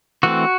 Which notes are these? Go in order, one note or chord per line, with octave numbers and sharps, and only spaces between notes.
E3 A3 C4 F#4